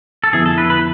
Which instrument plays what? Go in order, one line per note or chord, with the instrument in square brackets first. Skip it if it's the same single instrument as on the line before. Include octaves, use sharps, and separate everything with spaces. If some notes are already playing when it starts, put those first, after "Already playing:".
[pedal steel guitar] A4
[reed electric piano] F2 D3 F3 B3 E4 [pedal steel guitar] G#4
[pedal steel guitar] A4
B4
B4